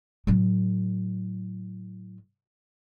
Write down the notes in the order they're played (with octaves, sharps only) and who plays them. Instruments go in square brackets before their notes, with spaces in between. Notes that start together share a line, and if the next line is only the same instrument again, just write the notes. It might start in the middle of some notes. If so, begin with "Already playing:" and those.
[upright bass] A2 F#3